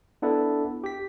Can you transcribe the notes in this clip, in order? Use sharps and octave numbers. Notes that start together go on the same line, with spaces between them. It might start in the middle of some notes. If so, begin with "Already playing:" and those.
B3 D4 E4 A4
G4 B6